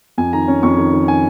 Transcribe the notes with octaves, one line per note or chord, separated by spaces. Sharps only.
F2 G#5
D#3 A#5
C#4
F2 C#6
D#3
D#3
D#3 G#5